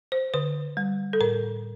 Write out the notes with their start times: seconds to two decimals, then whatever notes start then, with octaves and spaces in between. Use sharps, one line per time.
0.12 C5
0.34 D3 B4
0.77 G3
1.13 A4
1.21 A2 A#4